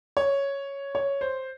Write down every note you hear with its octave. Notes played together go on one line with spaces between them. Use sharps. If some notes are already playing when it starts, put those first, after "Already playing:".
C#5
C#5
C5